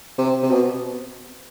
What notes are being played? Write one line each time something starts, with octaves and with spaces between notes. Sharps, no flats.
C3
C3
B2